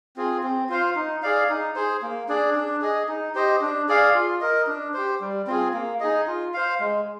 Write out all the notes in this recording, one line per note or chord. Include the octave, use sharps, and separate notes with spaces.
C4 F4 G#4
C4
F4 C5 F5
D#4
G#4 D5 F5
D#4
G#4 C5
A#3
D4 G#4 D5
D4
G#4 D#5
D#4
G4 C5 D#5
D4
G#4 D5 F5
F4
A#4 D#5
D4
G4 C5
G3
C4 F4 G#4
A#3
D#4 G#4 D#5
F4
C5 F5
G#3